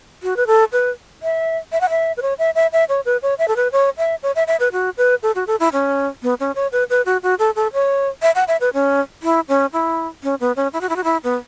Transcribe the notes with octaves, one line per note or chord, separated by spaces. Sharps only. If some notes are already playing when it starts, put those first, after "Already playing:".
F#4
B4
A4
B4
E5
E5
F#5
E5
B4
C#5
E5
E5
E5
C#5
B4
C#5
E5
A4
B4
C#5
E5
C#5
E5
E5
B4
F#4
B4
A4
F#4
A4
E4
C#4
B3
C#4
C#5
B4
B4
F#4
F#4
A4
A4
C#5
E5
F#5
E5
B4
C#4
E4
C#4
E4
C#4
B3
C#4
E4
F#4
E4
F#4
E4
B3